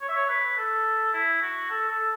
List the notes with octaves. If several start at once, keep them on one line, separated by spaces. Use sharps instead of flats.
C#5
E5
C#5
B4
A4
E4
F#4
A4
A4